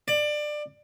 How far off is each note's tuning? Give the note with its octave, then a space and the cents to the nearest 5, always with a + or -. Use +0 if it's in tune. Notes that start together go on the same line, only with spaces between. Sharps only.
D5 +20